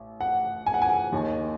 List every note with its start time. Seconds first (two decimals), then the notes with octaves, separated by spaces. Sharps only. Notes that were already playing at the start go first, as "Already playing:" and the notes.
Already playing: A1
0.21 F#5
0.66 G#5
0.74 F#5
0.82 G#5
1.12 D#2 D#3